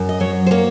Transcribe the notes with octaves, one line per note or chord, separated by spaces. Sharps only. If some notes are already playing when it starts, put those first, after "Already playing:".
Already playing: F#2
D#5
F#3 C#5
C5
A#3 C#5